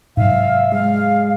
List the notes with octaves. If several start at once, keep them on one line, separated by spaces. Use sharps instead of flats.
G#2 C3 F#3 E5 F5
G#3 F5